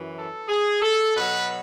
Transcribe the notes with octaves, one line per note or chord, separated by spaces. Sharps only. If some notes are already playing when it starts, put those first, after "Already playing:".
Already playing: F#2 E3
A4
G#4
A4
B2 F#3 B4